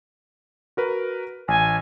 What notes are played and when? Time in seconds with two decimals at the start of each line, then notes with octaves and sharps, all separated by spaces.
0.77 F#4 A#4 B4
1.48 A1 G#5